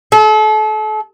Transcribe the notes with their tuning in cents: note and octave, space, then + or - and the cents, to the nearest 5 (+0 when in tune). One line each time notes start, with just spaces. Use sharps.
A4 -35